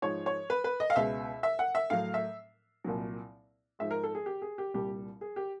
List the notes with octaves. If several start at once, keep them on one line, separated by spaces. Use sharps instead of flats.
G#2 F3 G#3 C#5
C#5
B4
B4
D#5
F5
C#2 B2 G#3 E5
E5
F#5
E5
A2 F#3 F5
E5
C2 A#2 F#3
G#2 F3 G#3 E5
A#4
A4
G#4
G4
G#4
G4
C2 A#2 G3 G4
G#4
G4